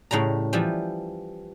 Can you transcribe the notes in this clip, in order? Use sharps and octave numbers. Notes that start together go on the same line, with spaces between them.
A2 C#3 G3 A#5
E3 F3 G3